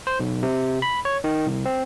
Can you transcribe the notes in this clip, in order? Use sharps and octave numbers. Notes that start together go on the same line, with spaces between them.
C5
B1
C3
B5
C#5
D#3
C2
C4